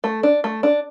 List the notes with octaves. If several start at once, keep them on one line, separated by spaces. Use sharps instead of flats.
A3
D4
A3
D4